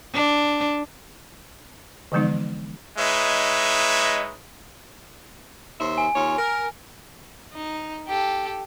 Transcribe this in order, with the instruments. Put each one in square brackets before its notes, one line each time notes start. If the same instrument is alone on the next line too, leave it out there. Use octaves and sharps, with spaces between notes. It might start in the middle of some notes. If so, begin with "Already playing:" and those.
[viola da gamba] D4
[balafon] D3 E3 F3 G#3 B3 D#4
[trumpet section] G#3 D#4 B4 C#5 D#5 E5
[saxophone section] D#2 C5 E5
[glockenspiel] G#5
[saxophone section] D#2 F4 C#5
A#4
[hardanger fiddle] D#4
G4 A4